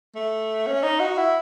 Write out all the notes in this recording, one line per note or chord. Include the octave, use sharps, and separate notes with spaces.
A3
C#4
D#4
F#4
E4